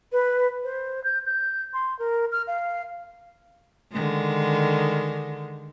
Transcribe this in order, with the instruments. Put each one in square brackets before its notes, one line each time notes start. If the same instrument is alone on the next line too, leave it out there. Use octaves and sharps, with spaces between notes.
[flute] B4
C5
G6
G6
C6
A#4
F6
F5
[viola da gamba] D3 D#3 G#3